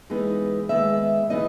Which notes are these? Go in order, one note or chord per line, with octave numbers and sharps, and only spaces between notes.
E3 G#3 B3 D#4
D#3 G#3 B3 E5
E3 B3 D#4 D#5